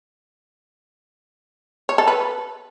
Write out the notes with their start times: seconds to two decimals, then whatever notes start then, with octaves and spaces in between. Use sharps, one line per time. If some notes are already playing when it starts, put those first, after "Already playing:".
1.89 C#5
1.98 A4
2.07 B4